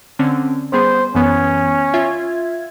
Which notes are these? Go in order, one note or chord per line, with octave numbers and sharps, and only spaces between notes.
D3 C4 C#4
G3 B3 G#4 C5
F#2 E3 B3 C#4
F4 E5 G#6